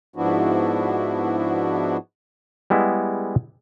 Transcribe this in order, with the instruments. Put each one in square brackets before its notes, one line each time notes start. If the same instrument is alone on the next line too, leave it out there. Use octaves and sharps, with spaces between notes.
[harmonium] G#2 F3 B3 D4 E4 F#4
[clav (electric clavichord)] G3 G#3 B3 E4